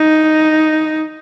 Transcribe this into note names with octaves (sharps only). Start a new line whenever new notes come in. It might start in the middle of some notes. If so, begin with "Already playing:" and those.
Already playing: D#4